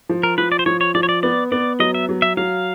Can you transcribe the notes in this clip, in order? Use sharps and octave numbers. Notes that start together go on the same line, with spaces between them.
F3
A#4
F3 B4
D5
C5
F3 C#5
C#5
F3 D5
C#5
D5
B3 D5
B3 D5
F#3 D#5
E5
F#3
E5
F#3 F5